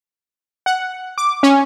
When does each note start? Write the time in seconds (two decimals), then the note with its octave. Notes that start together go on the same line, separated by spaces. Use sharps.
0.66 F#5
1.18 D6
1.43 C#4